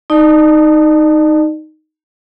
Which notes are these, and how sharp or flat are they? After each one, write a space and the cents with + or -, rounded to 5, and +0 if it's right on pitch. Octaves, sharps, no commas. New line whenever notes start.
D#4 +0 D5 +40 A5 +0